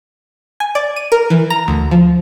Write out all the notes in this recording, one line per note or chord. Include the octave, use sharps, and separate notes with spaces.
G#5
D5
D#7
A#4
E3
A#5
D2
F3